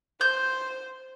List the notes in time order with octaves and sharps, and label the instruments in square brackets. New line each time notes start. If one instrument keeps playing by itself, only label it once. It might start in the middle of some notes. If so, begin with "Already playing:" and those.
[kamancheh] C5 [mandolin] G6